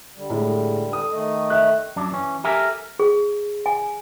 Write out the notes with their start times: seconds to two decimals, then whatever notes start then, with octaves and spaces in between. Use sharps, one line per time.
0.16 D3 G3
0.30 A2 G#3
0.91 A4 D#6
1.12 D#3 A3 D#5
1.50 E5 F#6
1.96 F#2 D4
2.11 E3 C#4
2.44 G4 A4 A#4 E5 G#5
2.99 G#4
3.66 G#5